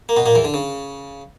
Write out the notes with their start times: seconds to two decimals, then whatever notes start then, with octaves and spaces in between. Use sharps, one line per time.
0.09 A#3
0.16 B2 B3
0.26 A#2 A#3
0.35 E2 E3
0.44 D3
0.54 C#3